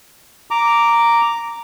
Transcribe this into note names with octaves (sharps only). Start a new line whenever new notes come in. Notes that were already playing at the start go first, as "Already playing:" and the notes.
A#5 D6